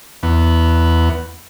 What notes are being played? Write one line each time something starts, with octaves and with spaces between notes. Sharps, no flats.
E2 B3